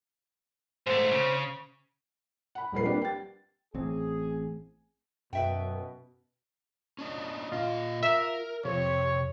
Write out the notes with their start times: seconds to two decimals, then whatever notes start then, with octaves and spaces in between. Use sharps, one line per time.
0.87 G#2 A3 C5
1.11 C#3
2.55 F#5 B5
2.72 D#1 F3 G#3 A#4 B4 C7
2.85 A#3 C4 D4 G4 B4 F#5
3.02 G5 A6
3.75 A1 A2 C4 G#4
5.33 F#2 B2 B4 E5 G5
6.99 C#4 D4 D#5
7.52 A#2 F4 D#5
8.03 A#4 E5
8.65 F2 C3 C#5